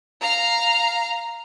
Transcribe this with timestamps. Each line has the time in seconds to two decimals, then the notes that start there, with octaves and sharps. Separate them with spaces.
0.21 F5 A#5